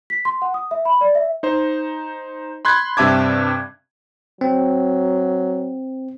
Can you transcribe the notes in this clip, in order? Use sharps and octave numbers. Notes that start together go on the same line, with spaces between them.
B6
C6
F#5
D#6
E5
B5
D5
E5
D#4 C5
B5 C6 F#6 G#6
G2 C3 E5 A5 D6 G#6
F#3 C4